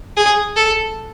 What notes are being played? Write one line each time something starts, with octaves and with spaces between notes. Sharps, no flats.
G#4
A4